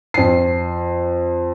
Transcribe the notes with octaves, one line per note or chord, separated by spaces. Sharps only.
F2 C7